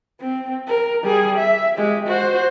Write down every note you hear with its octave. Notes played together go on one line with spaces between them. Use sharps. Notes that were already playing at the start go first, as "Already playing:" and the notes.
C4
A#4
G3 G#4
E5
G#3 G4
F#4 C5